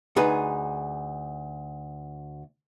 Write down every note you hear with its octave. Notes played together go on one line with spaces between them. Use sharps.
D2 D#4 G#4 B4